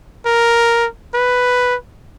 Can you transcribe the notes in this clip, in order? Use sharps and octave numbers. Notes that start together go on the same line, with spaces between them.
A#4
B4